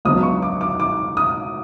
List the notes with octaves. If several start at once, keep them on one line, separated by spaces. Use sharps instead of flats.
C#2 C#3 F#3 B3 D4 D#6
C#6
D6
D6
D6
D#6